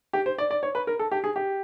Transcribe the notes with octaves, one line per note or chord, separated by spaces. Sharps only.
G4
C5
D5
D5
C#5
B4
A#4
A4
G4
G#4
G4